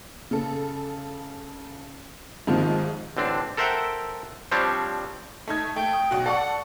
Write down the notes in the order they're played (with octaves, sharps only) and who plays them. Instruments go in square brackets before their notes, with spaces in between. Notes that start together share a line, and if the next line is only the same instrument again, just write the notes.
[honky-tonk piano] C#3 A4
G#2 C3 D#3 F3 F4
[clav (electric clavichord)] A1 D3 C4 D4
A4 A#4 C5 E5 F#5 G5
F3 G3 C4 D4 C#5
[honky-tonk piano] A3 D#4 G#6
[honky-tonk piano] A3 [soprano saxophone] G5
[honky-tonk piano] D#6
B1 F#4
[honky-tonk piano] A4 D5 C#6 [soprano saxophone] F#5